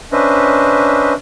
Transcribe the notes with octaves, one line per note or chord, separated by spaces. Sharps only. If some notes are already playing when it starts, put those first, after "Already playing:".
C#4 D4 B4 C5 D#5 E5